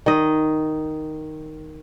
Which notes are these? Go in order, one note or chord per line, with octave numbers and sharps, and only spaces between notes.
D#3 D#5